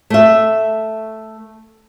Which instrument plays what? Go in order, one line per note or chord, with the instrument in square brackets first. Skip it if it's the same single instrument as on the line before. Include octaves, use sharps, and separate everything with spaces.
[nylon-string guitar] A3 E5